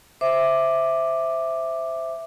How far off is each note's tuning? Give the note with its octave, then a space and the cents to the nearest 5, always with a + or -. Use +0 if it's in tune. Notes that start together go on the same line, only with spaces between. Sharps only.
C5 +0 E5 +0 D6 +5